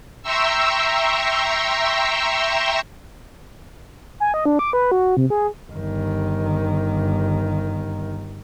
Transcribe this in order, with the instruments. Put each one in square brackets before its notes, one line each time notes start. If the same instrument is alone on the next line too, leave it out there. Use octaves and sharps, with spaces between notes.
[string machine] E5 G5 A#5 C6 C#6 E6
[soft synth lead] G#5
D#5
D4
D6
B4
F#4
C3
G#4
[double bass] G1 D#3